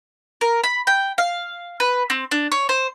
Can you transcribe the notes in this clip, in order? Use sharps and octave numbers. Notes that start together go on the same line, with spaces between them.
A#4
B5
G5
F5
B4
C4
D4
C#5
C5